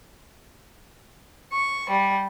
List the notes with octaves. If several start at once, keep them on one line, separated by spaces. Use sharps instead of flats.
C#6
G3